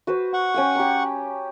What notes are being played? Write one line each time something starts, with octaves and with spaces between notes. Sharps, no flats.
F#4 B4 C5
F#5 C#6
C#4 G5 G#5
G4 A#5